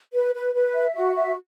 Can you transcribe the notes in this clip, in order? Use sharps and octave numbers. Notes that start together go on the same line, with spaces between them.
B4
B4
B4
E5
F#4
E5